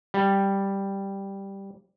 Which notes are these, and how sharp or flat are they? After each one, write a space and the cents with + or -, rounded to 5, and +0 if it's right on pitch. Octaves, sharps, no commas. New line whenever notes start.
G3 +0